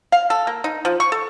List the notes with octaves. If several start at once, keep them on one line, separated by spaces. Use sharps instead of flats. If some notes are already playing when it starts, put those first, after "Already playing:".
F5
A4
A#3
D#4
F3
C#6
A4